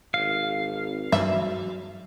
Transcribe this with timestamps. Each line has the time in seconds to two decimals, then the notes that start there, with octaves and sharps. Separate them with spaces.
0.14 G#1 F5
1.12 G2 E3 F#3 G3 E5